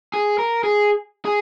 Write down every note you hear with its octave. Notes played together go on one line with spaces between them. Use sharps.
G#4
A#4
G#4
G#4